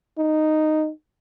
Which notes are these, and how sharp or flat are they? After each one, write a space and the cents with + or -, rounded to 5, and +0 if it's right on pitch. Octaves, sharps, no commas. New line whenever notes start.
D#4 -5